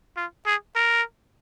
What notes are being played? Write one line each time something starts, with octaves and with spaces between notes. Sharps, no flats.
F4
G#4
A#4